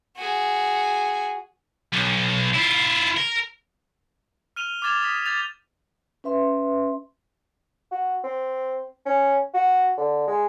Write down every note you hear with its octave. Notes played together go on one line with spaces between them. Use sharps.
F#4 G#4
B1
E4 F4
A#4
F6 D#7 F7 G7
D6 F6 G#6 A6 E7 G7
D#6 B6
G6 A6 F7
C#4 B4 E5 C6
F#4
C4
C#4
F#4
D3
G#3